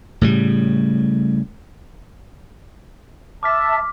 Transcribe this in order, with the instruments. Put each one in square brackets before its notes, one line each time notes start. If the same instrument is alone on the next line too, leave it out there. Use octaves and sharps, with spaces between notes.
[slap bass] A2 C#3 G3
[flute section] E5 A5 [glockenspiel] D6 F6 B6